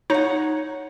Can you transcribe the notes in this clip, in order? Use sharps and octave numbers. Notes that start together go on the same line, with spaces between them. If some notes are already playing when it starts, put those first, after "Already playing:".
D#4 C#5 F#5